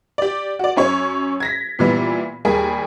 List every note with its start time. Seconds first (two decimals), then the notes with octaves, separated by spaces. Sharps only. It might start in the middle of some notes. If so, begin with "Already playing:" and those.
0.18 G4 D5
0.59 F#4 D5
0.76 F#2 C#4 C#5
1.40 G#6 A#6 B6
1.79 A#2 E3 G3 B3
2.45 D#2 G3 G#4 A#4 G#5